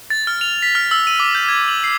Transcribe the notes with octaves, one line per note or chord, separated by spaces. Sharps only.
A6
F6
F7
B6
F6
E6
D#7
D6
G6
G#6
F#7
C7